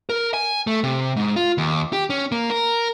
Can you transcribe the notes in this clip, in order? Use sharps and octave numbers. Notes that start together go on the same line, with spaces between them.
A#4
G#5
A3
C3
G#2
F4
D#2
G4
C#4
A#3
A#4